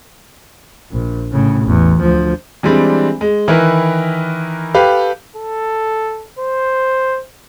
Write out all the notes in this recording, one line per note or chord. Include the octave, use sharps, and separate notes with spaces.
A#1
A2 C#3
A1 E2
D2 F3
E3 G3 G#3 C4 D4
G#3
D#3 E3 E4 A#4 B4
G4 A4 B4 F5
A4
C5